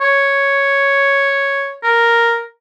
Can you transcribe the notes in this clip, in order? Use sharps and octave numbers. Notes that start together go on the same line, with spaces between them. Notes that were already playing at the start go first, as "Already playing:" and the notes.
C#5
A#4